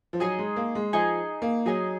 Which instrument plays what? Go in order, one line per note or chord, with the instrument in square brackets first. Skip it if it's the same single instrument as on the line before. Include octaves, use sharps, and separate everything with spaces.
[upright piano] F3
[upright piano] F#3 [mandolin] D#4 G#4 D#5 G#5
[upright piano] G#3
A#3
G#3
[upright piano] F3 [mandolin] D#4 G#4 D#5 G#5
[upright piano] A#3
[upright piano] F#3 [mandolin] D#4 G#4 D#5 G#5